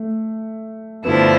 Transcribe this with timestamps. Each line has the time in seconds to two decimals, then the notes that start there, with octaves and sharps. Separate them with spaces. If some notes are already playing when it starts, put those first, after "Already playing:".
Already playing: A3
1.05 G2 D3 F3 A3 B3 E4